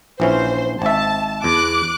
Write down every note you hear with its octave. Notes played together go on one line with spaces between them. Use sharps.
A#1 E3 C#4 C5
G#1 E5 A5
E2 D6 F#6